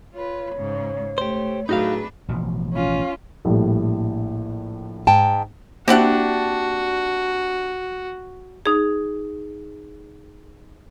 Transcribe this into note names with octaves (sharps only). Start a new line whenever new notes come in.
F4 B4 C#5
G#2 C#3
A3 G4 C5
A2 F#3 D4 D#4 F#4 G#4 B4 F5
A1 B2 F3
C#4 F4
A#1 A2 G3
G#2 G5 A5
A#3 C4 D4 E4 F#4 G4 F#5
D#4 G#4